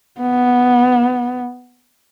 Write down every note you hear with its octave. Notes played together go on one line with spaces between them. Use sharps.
B3